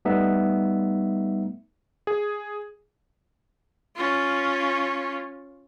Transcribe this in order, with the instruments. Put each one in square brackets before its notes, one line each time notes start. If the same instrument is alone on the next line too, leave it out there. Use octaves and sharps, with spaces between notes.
[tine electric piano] G3 A3 B3 D#4 E5
[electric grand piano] G#4
[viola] C#4 F4